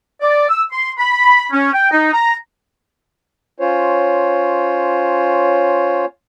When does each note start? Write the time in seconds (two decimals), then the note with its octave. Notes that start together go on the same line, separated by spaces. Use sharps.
0.22 D5
0.49 E6
0.72 C6
0.99 B5
1.52 C#4
1.74 G5
1.92 D#4
2.13 A#5
3.60 C#4 F4 C5 C#5